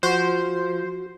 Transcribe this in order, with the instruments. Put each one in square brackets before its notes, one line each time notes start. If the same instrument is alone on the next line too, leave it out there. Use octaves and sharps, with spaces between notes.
[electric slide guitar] F3 [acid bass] F#4 [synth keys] C5